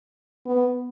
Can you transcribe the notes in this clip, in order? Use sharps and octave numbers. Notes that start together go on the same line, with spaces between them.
B3